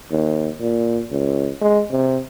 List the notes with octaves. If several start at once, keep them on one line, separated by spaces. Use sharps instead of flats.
D#2
A#2
C#2
G#3
C3